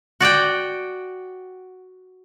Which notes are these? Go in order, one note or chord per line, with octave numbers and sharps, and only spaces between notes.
F#4 D5 F#5 G5